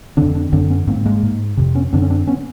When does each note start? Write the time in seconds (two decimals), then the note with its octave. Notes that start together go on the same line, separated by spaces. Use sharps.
0.17 D3 C4 D4
0.22 F2
0.35 C4 D4
0.52 F#2 D3 C4 D4
0.70 B3 C#4
0.87 G#2 A#3 C4
1.06 G#3 A#3
1.23 G#2
1.57 F2 C3
1.75 B3 C#4
1.93 F#2 D3 C4 D4
2.02 C#4
2.10 C4 D4
2.27 B3 C#4